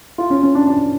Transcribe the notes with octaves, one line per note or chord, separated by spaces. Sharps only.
F4
C#4
C#4
D4
D4